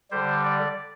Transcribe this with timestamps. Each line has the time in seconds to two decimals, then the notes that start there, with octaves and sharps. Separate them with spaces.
0.11 D3 G3 C5
0.45 D5